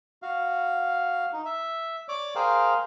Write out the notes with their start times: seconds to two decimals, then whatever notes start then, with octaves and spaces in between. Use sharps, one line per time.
0.22 F#4 F5
1.33 D#4
1.45 E5
2.08 C#5 D5 D6
2.35 G#4 A#4 C5 F5 G5